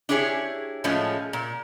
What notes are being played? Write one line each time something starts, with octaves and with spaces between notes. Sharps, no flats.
D4 E4 G4 G#4 C#5
A2 F3 G#3 A3 C#4 F4
A#2